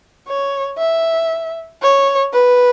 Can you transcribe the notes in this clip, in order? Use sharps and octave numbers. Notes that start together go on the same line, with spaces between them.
C#5
E5
C#5
B4